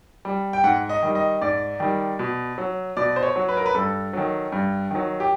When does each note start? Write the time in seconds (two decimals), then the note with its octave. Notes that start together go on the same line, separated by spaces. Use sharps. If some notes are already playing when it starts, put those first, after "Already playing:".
0.25 G3
0.53 G5
0.64 G#2 F#5
0.89 D#5
1.03 D#3 G3
1.15 D#5
1.42 G#2 D5
1.80 D#3 G3
2.19 B2
2.58 F#3
2.97 B2 D5
3.16 C5
3.23 C#5
3.36 F#3
3.49 B4
3.57 A#4
3.66 B4
3.75 G2 A4
4.13 D#3 F#3
4.52 G2
4.91 D#3 F#3
5.20 G4